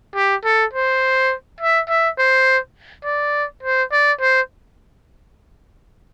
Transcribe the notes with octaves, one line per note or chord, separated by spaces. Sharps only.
G4
A4
C5
E5
E5
C5
D5
C5
D5
C5